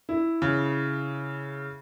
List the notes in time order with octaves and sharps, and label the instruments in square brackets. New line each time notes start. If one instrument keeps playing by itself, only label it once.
[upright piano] E4
[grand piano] C#3